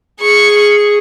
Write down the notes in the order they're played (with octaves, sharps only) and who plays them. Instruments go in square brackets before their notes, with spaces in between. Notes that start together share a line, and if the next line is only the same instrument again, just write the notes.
[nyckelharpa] G#4 [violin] C#6